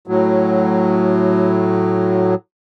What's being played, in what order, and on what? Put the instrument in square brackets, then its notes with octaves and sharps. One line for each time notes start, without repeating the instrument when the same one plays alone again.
[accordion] A2 F#3